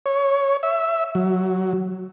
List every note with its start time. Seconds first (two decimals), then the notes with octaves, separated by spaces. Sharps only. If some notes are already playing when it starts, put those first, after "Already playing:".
0.06 C#5
0.63 E5
1.15 F#3